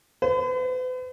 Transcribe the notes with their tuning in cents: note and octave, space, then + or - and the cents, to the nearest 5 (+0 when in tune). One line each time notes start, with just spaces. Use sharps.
B4 +45